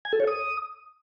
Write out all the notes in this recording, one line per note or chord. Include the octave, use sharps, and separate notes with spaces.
G#5
A4
C#5
D#6